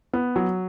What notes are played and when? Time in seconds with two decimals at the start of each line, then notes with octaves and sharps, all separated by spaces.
0.13 B3
0.36 F#3